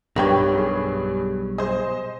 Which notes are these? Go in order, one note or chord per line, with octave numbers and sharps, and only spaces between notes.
B1 G2 G3 A#4 B4 C#5 G5
G2 G#4
G#4 C5 D#5